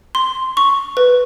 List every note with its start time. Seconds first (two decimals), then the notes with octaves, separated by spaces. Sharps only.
0.15 C6
0.57 C#6
0.97 B4